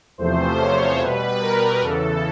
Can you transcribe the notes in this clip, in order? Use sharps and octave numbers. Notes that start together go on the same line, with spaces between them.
E2 C3 F3 A3 C5
C#5
B2 G3 B4
A#4
E2 C#3 E3 A4